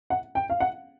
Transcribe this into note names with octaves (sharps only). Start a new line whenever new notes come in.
F#5
G5
F5
F#5